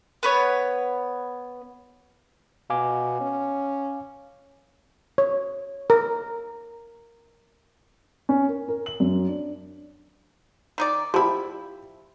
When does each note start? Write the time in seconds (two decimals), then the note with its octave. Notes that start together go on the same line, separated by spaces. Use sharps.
0.23 B3 B4 C#5
2.70 B2 F5 G#5 D6
3.21 C#4
5.18 C#5
5.90 A#4
8.29 C#4
8.48 A#4
8.68 A#4
8.86 F#7
9.00 F#2
9.28 D4
10.78 D#3 D#4 D5
11.14 F3 E4 G4 B5